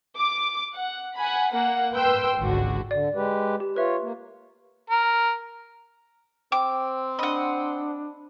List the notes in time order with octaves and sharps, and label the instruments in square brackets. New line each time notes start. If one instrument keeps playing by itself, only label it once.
[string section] D6
F#5
F#5 G#5 B5
A#3 F#5
B4 G5 C6 E6
G#1 C#2 D3 F#4
[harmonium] D3 [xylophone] D5
[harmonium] G#3 G4 B4
[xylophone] G4
[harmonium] F4 C#5 [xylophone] B4 E5
[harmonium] A#3
[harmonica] A#4
[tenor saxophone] C4 [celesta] G5 [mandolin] D6
[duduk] D4 [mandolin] D#5 F#5 [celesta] B5